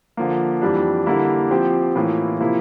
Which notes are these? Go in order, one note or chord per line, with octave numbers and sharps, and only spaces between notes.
D3 F3 A#3
F2 E3 G3 D4
D3 G3 A#3 E4
F3 C4 G4 C5
A2 E3 A#3 F4
C3 F3 A#3 E4